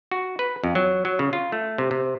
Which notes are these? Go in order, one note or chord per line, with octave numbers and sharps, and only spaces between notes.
F#4
B4
F2
F#3
F#3
C#3
F4
A3
C3
C3